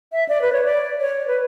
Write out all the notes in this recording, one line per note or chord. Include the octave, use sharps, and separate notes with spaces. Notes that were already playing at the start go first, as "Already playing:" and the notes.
E5
D5
B4
C#5
D5
C#5
B4